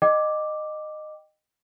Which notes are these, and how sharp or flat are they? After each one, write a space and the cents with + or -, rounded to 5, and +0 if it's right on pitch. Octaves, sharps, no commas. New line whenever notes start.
D#5 -15 G5 +0 D6 +0